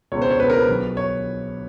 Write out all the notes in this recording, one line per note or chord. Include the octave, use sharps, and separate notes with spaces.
C#2 B2 C#5
C5
C#5
C#2 B2 B4
A#4
B4
B1 B2
C#5